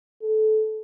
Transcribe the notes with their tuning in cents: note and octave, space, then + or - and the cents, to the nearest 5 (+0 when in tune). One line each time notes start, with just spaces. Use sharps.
A4 -20